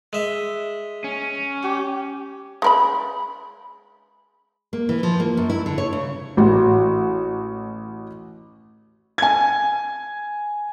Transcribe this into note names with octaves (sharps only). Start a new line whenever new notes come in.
G#3 E5
C#4
G4
G#3 A#4 B5
A#3
E3
F3
A#3
F#2
E4
D3
C#5
C#3
A1 F#4
G#5 G#6